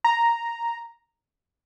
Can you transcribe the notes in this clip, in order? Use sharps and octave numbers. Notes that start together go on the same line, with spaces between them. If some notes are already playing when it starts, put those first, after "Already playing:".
A#5